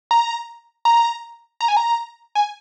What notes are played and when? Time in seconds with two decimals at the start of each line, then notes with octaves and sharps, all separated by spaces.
0.11 A#5
0.85 A#5
1.61 A#5
1.68 G#5
1.77 A#5
2.35 G#5